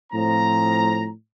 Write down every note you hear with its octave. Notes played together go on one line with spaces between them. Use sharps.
A2 F3 C4 A#5